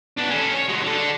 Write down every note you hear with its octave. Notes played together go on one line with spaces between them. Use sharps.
B3 D4
C#4 A4
C#5
F#3 G#3
D3 A4